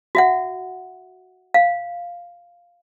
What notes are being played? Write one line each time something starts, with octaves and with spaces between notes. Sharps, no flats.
F#4 E5 F#5
F5